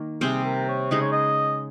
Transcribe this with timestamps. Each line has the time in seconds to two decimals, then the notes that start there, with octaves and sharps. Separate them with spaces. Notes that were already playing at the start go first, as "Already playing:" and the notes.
Already playing: D#3 A#3
0.21 C3 G3 C4 G#4
0.44 A#4
0.68 C#5
0.91 C#3 G#3 D#4 G#4 D#5
1.01 C#5
1.12 D#5